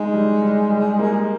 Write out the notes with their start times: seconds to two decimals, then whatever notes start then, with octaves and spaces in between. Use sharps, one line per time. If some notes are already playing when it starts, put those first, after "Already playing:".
Already playing: G#3 D#4
0.14 G3
0.42 G3
0.70 G3
0.99 A#3